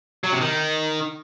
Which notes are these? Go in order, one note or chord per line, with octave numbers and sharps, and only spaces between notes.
F#3
C3
D#3